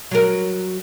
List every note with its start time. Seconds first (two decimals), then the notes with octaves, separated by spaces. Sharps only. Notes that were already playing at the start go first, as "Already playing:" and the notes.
0.11 F#3 A#4